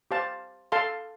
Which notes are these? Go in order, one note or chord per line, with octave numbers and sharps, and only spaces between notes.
G4 C5 F5 A5
A4 F5 A5 C6